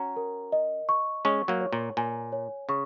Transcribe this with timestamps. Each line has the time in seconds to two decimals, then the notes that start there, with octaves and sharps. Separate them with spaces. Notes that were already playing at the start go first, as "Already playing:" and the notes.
Already playing: C#4 F#4 A#5
0.16 A#4
0.52 D#5
0.89 C#6
1.25 G#3 C#4 C#6
1.48 F#3 A#3
1.61 C#5
1.73 A#2
1.97 A#2 G#5
2.32 C#5
2.69 C#3 C#6